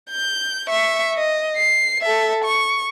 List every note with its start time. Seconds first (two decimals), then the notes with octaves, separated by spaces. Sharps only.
0.11 G6
0.68 E5 C#6
1.16 D#5
1.57 C7
2.01 A4 E5
2.44 C#6